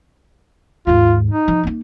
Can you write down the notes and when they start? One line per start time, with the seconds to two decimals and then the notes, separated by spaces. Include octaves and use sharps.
0.87 D#2 G#2 F4
1.30 D#4
1.48 F3
1.63 A#3 D#4